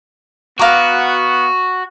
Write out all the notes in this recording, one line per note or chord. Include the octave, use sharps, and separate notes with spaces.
B3 F#4 F5 A#5 D6